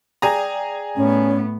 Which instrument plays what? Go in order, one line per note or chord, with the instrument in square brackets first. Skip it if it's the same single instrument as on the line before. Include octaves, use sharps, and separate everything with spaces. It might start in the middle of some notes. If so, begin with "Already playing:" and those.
[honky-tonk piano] G#4 G#5 A#5 [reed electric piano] D5 G5 D#6
[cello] A2 B3 [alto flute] C#4